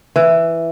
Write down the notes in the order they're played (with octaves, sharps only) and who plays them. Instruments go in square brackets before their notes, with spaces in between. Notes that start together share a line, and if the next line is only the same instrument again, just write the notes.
[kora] E3